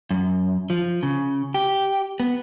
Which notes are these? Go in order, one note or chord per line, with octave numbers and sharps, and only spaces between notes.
F#2
F3
C#3
G4
B3